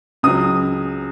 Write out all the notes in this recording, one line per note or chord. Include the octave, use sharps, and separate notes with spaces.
C#2 C#3 F#3 D#6